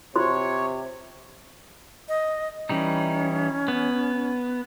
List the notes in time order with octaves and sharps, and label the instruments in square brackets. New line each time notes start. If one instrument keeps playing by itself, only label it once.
[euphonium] C3 [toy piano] F4 C5 C6 [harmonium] C#5
[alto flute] D#5
[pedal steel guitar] E3 G3 D#4 [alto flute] C#4
[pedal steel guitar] B3